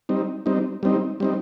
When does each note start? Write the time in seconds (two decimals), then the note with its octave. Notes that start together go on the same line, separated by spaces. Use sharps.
0.09 G3 C4 D#4
0.46 G3 C4 D#4
0.83 G3 C4 D#4
1.20 G3 C4 D#4